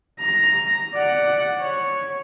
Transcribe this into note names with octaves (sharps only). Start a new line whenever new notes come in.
A#5
D5 F#5
C#5